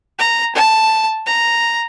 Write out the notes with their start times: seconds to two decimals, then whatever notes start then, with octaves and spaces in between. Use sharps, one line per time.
0.19 A#5
0.55 A5
1.26 A#5